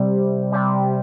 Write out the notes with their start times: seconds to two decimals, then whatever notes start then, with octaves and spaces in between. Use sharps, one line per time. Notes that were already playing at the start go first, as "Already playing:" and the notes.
Already playing: C3 G3
0.52 C3 G3